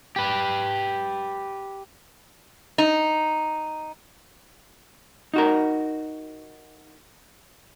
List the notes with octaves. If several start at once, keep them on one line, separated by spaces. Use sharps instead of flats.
G4 B4
D#4
D#4 F#4 A#4